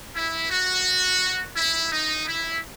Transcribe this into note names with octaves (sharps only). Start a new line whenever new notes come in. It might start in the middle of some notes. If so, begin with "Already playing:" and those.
E4
F#4
E4
D#4
E4